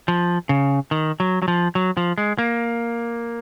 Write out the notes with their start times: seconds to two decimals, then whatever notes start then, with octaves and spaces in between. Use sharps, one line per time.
0.08 F3
0.49 C#3
0.91 D#3
1.20 F#3
1.42 F#3
1.48 F3
1.75 F#3
1.97 F3
2.18 G#3
2.38 A#3